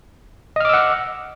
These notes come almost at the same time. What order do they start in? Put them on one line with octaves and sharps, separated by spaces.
D#5 F6 D6 E6 F#5